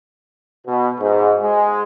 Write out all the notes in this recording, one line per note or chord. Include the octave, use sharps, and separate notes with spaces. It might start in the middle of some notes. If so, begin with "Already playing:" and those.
B2
G#2
G#3